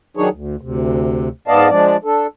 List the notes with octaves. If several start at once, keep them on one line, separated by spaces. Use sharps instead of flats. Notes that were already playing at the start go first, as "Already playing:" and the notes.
D#3 F#3 D4 D#4 G#4 C#5
D2
D2 C3
G#2 B3 D5 D#5 F5 A5
F3 G#3 D4 D5
D4 A4